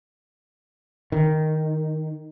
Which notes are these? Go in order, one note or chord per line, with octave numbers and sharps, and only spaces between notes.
D#3